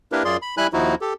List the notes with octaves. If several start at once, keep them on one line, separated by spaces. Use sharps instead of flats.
A#3 D4 E4 G4 A#4 B4
F#2 F4 G#4 D5 C6
B5
G3 E4 G#5 B5 F#6
D#2 F3 D#4 E4 F#4
G4 A4